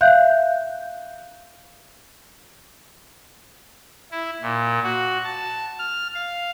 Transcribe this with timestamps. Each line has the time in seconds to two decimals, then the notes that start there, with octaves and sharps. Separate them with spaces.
0.01 E5 F5 F#6 G6
4.12 E4
4.42 A#2
4.83 F#4
5.24 A5
5.79 F6
6.15 F5